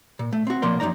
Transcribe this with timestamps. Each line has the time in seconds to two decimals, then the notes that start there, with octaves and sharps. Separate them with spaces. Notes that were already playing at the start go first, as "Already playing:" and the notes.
0.19 A#2
0.33 A3
0.47 C4 F#4
0.62 B1 A#2 F3 A#3 D5 C6
0.80 F#2 C3 D#4 D5 A#5